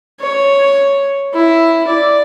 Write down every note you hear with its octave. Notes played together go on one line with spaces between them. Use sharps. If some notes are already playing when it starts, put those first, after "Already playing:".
C#5
E4
D5